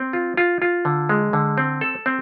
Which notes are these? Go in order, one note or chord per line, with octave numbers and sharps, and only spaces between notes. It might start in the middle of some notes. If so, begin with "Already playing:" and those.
Already playing: C4
F4
F4
F4
D3
G#3
D3
C4
A4
C4